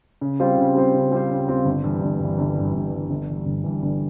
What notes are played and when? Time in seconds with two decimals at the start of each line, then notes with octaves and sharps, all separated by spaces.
0.21 C#3
0.40 G3 C4 F4 C5
0.57 C#3
0.75 G3 C4 F4 C5
0.94 C#3
1.12 G3 C4 F4 C5
1.30 C#3
1.47 G3 C4 F4 C5
1.65 G1
1.84 G2 E3
2.01 G1
2.19 G2
2.25 E3
2.38 G1
2.55 G2 E3
2.73 G1
2.92 G2 E3
3.10 G1
3.28 G2 E3
3.45 G1
3.64 G2 E3
3.82 G1